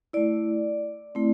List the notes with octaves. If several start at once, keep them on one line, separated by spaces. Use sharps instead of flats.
A3 E4 D5
A3 C4 E4